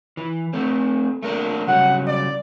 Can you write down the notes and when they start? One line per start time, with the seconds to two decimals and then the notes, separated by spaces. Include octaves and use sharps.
0.17 E3
0.53 A3 C4
1.23 A3 A#3 D4
1.67 C#3 F#3 G3 F#5
2.07 D5